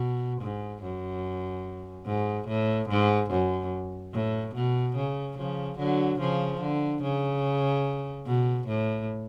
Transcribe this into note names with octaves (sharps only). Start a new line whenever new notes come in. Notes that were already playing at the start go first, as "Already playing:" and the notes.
Already playing: B2
G#2
F#2
G#2
A2
G#2
F#2
A2
B2
C#3
C#3 F3
D3 F#3
C#3 F3
D3
C#3
B2
A2